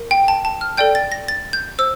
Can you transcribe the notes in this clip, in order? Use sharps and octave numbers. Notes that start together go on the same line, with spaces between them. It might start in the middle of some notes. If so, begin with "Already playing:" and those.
Already playing: A#4
G5
A5
A5
F6
A4 D5 G5 G6
A6
A#6
A6
G6
C5 E6